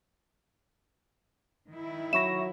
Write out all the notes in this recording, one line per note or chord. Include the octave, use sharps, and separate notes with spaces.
D#3 E4
F#3 E5 B5 C#6 A#6 E7